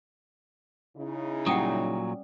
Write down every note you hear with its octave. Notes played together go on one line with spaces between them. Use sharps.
C#3 D#4 E4
A#2 F#3 G3 C#4 F#5 G5 D#6